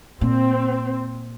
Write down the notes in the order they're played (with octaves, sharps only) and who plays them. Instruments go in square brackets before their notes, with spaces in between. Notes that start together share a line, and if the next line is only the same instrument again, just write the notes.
[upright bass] A#2 [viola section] C4